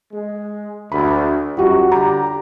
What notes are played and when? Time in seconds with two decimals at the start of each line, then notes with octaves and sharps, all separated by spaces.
0.13 G#3
0.92 D2 B5
1.57 F#2 G3 F4 F#4
1.92 D3 G3 G4 A#5